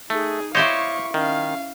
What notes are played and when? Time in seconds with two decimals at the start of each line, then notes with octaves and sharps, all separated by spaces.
0.10 A3 D#4 G#4
0.55 E4 G4 C5 C#5 D#5 F5 C#6
1.14 D#3 C#4 F5